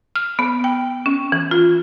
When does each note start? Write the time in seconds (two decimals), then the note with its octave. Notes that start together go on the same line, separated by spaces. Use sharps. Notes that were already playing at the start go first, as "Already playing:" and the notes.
0.16 F6
0.39 B3
0.64 G5
1.06 C#4
1.32 E3
1.51 F4